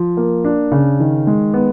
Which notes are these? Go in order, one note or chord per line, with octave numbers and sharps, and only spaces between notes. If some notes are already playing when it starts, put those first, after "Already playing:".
Already playing: F3
A#3
D4
C#3
D#3
G#3
B3